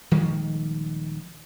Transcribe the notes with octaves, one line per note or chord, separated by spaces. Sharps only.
D#1 D#3 F3 G#3